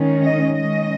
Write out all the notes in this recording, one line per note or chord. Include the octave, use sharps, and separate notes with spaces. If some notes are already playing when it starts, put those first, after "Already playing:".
Already playing: D#3 G#3 C#4
D#5
D#3 G#3 C#4 D#5